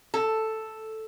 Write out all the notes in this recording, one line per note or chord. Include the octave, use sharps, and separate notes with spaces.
A4